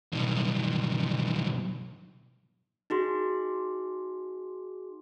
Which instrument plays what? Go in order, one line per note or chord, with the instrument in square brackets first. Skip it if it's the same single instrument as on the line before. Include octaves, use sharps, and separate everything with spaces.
[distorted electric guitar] B1 G2
[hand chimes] D#4 F#4 G#4 C6